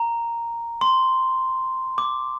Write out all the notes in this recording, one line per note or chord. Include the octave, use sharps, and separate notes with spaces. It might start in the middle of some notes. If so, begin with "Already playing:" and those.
Already playing: A#5
C6
D6